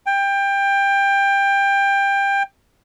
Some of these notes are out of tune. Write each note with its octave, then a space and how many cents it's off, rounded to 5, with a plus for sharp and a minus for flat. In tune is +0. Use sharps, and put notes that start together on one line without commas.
G5 +20